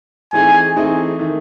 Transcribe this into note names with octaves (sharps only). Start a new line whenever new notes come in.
E3 A3 C4 D#4 G#4 G#5
E3 A3 C4 D#4 G#4
D#3 A3